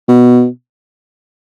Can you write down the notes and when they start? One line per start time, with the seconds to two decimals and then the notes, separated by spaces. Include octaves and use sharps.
0.09 B2